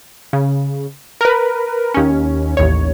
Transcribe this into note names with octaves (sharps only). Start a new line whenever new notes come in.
C#3
A#4 B4
D#2 C#4
A1 D#2 C#5